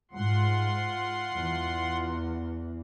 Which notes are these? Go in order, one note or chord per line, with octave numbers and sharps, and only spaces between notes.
G#2 F4 F#5 C6
E2